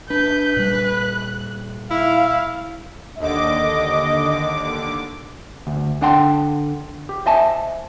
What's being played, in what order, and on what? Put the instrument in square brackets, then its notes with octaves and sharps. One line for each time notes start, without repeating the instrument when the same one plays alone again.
[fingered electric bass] D4 [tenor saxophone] B4 [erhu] G6
[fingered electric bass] A#2 G3 [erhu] F#6
[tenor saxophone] E4 [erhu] F5
[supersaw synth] D#2 D3 D6 [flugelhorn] D#5
[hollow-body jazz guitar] D2
D3 D4 F#5 G5 A5 C6
G4
C5 D#5 E5 G#5 A5